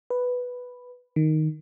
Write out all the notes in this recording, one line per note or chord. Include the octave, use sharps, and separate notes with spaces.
B4
D#3